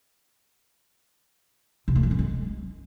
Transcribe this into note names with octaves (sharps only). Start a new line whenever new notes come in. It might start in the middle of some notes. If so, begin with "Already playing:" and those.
C3
A3
F#3
C#4
G#3